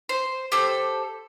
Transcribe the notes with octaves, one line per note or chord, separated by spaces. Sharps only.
C5
G4 A4 C5